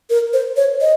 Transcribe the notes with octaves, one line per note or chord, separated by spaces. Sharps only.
A#4
C5
C#5
D#5